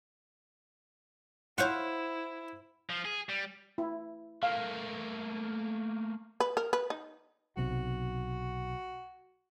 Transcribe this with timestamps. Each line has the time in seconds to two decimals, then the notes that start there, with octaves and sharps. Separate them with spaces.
1.58 E4 F4 C5 C#5 F5 F#5 C#6
2.90 F3
3.05 G#4
3.29 G3
3.78 E4
4.43 A3 A#3 F5
6.40 B4
6.57 A#4
6.73 B4
6.90 D#4
7.57 B1 C3 F#3 F#4